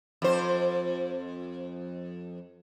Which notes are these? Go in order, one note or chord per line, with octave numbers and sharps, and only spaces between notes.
F2 C5